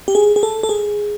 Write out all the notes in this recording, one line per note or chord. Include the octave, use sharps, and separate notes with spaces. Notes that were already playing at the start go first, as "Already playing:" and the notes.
G4
G#4
G#4
A4
A4
G#4